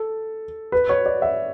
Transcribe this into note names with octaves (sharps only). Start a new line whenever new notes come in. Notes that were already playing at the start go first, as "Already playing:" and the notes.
Already playing: A4
B4
C#5
D5
E5